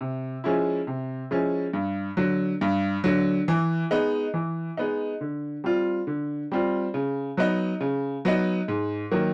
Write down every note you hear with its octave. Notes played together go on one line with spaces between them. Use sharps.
C3
F3 G#3 C#4 E4
C3
F3 G#3 C#4 E4
G2
D3 F#3
G2
D3 F#3
E3
G#3 B3 D#4
E3
G#3 B3 D#4
D3
G3 C4 F4
D3
G3 C4 F4
C#3
F#3 B3 D#4
C#3
F#3 B3 D#4
G#2
D#3 F#3 A#3